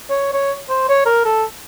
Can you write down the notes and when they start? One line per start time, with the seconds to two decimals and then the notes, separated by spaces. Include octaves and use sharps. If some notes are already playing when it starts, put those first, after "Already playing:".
0.10 C#5
0.33 C#5
0.70 C5
0.89 C#5
1.06 A#4
1.25 A4